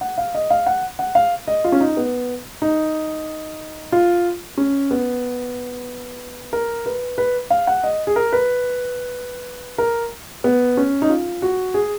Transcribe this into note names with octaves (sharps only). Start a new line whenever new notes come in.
F#5
F5
D#5
F5
F#5
F#5
F5
D#5
F4
C#4
D#4
B3
D#4
F4
C#4
B3
A#4
B4
B4
F5
F#5
D#5
G#4
A#4
B4
A#4
B3
C#4
D#4
F4
F#4
G#4